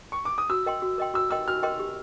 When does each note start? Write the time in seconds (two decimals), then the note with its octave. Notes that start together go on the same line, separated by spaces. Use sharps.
0.12 C#6
0.25 D6
0.38 D#6
0.50 F#4 E6
0.66 A#4 D#5 G5 C6
0.82 F#4
0.98 A#4 D#5 G5 C6
1.14 F#4 E6
1.30 A#4 D#5 G5 C6 E6
1.47 F#4 F6
1.63 A#4 D#5 G5 C6
1.79 G4